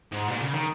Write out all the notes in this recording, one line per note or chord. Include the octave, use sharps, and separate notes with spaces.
G#2
A#2
C#3
D#3